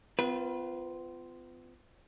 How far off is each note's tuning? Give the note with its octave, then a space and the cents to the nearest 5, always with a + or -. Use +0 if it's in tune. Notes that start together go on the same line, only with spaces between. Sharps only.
B3 +45 F4 -10 B4 -30